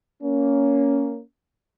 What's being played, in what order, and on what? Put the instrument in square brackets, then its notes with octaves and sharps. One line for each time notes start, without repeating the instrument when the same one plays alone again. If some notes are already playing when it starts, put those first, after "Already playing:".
[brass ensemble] A#3 C#4